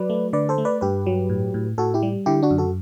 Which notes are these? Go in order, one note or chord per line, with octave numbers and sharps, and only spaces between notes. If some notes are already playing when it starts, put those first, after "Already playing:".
Already playing: F#3 B4 D5
A3
D3 B4 D5
A4 C5
A3
B4 D5
G2 G4 B4
F#3
A2
A2
A2 F#4 A4
E4 G4
G3
D3 E4 G4
D4 F#4
F#2
F#4 A4